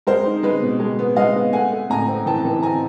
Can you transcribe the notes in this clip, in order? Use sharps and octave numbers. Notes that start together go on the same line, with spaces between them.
G#3 A#4 C5
D#4
G#3 B4
B2
G#3
B3
G#3 D#5 F5
B3
A3 F#5 G#5
A3
A2 G#5 A#5
C4
E3 G5 A5
E3
C4 G#5 A#5